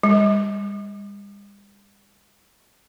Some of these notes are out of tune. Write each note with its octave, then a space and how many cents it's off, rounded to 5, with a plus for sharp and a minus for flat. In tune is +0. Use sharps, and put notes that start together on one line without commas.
G3 +45